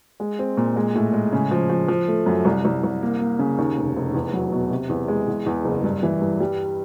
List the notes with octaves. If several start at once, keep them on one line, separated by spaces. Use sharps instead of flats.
G#3
C4
A#2
G#3
A2
G#3
C#3
F3
F3
F3
A3
F#2
C2
C2
C2
A#3
A#3
C#3
D#2
F1
F1
E2
F#3
B2
C3
E2
G#3
E2
E2
F#1
G2
E3
G2
G3